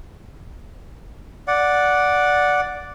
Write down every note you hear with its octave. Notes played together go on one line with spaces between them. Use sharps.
D5 F#5